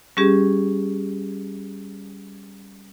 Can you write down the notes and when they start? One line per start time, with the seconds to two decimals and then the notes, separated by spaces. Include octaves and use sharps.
0.17 G3 C#4 G4 G#4